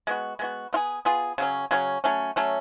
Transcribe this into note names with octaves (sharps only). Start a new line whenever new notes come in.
G#3 B3 F#4
G#3 B3 F#4
B3 F4 G#4
B3 F4 G#4
C#3 F#3 C#4
C#3 F#3 C#4
F#3 A3 C#4
F#3 A3 C#4